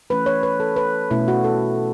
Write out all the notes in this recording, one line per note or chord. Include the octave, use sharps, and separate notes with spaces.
E3 A3 C#4 B4
C#5
B4
A4
B4
B2 A3 C#4 E4
F#4
A4